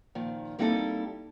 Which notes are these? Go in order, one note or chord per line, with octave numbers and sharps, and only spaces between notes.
A#2 D#3 F3
G3 A#3 C4 D#4 E4 A4